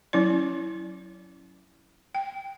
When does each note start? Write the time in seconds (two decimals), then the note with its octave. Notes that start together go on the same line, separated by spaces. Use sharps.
0.13 F#3 C#4 E4 D5
2.15 G5